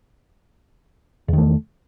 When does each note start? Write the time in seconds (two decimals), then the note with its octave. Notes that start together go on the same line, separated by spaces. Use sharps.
1.28 E2
1.33 D#3
1.38 A3